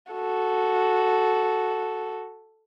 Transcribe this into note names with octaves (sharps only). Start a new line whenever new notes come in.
F#4 A4